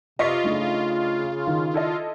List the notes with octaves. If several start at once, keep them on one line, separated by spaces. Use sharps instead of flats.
C3 F4 B4 D#5 C#6 B6
C#3 A3 D4 D#4
D#3
E4 A4 D#5